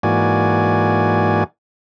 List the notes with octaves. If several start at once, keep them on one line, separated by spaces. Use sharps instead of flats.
G#2 E3 A#3 F#4 D5 G#5